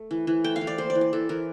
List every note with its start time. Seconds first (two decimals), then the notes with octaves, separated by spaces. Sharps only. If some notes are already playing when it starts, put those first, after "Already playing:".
Already playing: A3
0.11 E3
0.27 E3
0.44 A3 G5
0.56 F5
0.61 E3
0.67 D5
0.78 A#3 C5
0.90 D5
0.95 E3
1.01 D5
1.13 E3 A4
1.29 E3 A#4